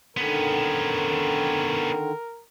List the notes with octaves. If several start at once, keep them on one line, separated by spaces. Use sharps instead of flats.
D3 D#3 B3 C#4 A#4